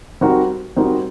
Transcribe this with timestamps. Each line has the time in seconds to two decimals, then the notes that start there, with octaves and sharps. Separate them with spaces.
0.21 G3 C4 D#4 F#4 A#4
0.76 G3 C4 D#4 F#4 A#4